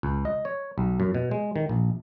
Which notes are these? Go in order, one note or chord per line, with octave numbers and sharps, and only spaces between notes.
C#2
D#5
C#5
B1
F#2
B2
G#3
D#3
A#1